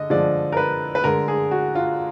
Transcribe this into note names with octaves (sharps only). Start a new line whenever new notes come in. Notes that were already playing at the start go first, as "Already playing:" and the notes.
Already playing: D3 D#5
D3 F3 G#3 D5
A#4
B4
B4
D3 G#3 A#4
G#4
F#4
F4